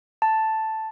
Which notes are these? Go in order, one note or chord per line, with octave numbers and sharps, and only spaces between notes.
A5